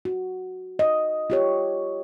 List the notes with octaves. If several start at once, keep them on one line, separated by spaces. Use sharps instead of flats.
F#4
D#5
F4 G4 C#5